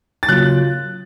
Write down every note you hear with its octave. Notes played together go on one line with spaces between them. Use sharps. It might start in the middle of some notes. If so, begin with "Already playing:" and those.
A6
C#3 F#3 A#3 F4 F#6